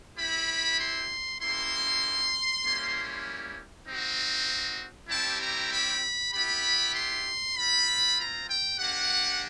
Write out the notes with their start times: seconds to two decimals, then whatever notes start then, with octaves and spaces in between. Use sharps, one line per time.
0.17 C4 E4 G4 B5
0.78 C6
1.40 A#3 C#4 E4 G4 C6
2.64 G3 A#3 C#4 E4
3.87 C4 D#4 F#4
5.09 G3 C4 E4 G4 A5
5.40 A#5
5.71 B5
6.33 B3 E4 G4 B5
6.95 C6
7.56 C4 F4 B5
8.18 A#5
8.48 G5
8.78 A#3 D4 G4 F#5